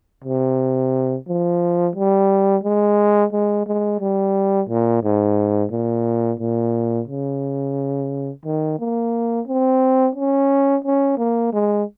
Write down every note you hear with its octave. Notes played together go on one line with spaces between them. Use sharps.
C3
F3
G3
G#3
G#3
G#3
G3
A#2
G#2
A#2
A#2
C#3
D#3
A#3
C4
C#4
C#4
A#3
G#3